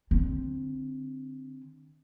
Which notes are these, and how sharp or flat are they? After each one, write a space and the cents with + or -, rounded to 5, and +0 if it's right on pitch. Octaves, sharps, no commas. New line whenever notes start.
D3 +0 C4 +0